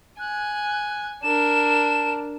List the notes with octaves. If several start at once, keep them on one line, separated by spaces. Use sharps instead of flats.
G#5 F#6
D4 A#4 E7